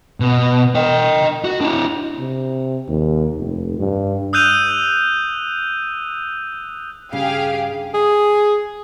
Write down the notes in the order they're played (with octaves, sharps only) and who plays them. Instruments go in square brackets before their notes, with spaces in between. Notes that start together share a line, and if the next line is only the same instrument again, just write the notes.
[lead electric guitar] B2
D#5 G5
F#4
D4 E4
[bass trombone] C3
D#2
F1
G2
[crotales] D#6 E6 F#6 G6 D#7 F7
[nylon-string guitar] G2 C#3 [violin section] G4 G#4 F5
[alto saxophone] G#4